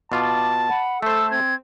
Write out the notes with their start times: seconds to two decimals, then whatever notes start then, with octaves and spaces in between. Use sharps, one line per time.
0.12 B2 F4 A5 D6
0.68 F#5 B5
1.02 A3 A4 C5 A5 E6
1.31 C4 G#6